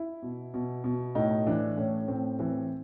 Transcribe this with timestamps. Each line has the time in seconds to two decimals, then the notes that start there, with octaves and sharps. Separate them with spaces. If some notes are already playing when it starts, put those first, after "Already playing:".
Already playing: E4
0.23 B2
0.54 B2
0.84 B2
1.15 A2 D#4
1.47 E3 D4
1.77 A2 C#4
2.08 A2 C4
2.39 E3 C4